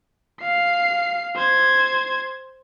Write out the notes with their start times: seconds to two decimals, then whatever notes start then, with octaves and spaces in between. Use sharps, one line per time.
0.41 F5 C7
1.36 C5 G#6